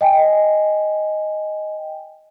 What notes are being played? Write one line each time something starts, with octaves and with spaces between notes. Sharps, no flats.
D#5 G5 G#5